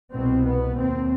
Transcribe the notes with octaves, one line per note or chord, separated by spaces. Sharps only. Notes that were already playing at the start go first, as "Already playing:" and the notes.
C2 B2 C4
B3
D#2 C4